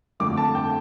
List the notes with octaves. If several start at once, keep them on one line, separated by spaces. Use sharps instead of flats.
F2 D3 A3 D6
A5
G5